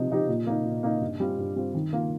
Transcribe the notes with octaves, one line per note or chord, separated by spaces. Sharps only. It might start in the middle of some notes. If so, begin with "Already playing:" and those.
Already playing: C3 F3 D#4 G4
F3 D#4 G4
A#2
A#3 D#4
A#2
A#3 D#4
G2
G3 C4 F4
G2
G3 C4 F4
D#3
A#3 F4